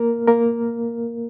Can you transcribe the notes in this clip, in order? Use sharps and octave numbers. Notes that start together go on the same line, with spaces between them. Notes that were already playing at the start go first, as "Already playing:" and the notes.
Already playing: A#3 A#4
A#3 A#4